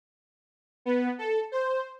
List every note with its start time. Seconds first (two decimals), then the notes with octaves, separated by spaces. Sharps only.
0.86 B3
1.18 A4
1.52 C5